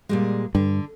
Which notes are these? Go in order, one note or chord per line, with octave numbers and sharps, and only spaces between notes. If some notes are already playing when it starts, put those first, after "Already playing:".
A#2 G3 G#3
G2 D3